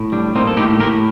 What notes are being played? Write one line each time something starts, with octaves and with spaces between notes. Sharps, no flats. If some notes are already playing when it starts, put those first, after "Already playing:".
Already playing: A2
G3 D4
A#3 C4 D#4
A4
A2 D#4 G4
A2 G4 A#4